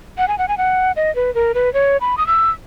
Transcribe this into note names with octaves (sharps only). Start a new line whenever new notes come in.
F#5
G#5
F#5
G#5
F#5
D#5
B4
A#4
B4
C#5
B5
D#6
E6